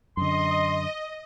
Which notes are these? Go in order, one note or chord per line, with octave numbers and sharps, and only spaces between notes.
F#2 D3 D#5 C6